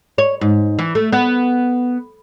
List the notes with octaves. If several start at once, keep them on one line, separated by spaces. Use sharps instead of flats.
C#5
G#2
E3
A3
B3